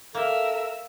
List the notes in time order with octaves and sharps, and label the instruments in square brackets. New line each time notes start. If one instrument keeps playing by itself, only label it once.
[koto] A#3 [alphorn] A4 [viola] A#4 E5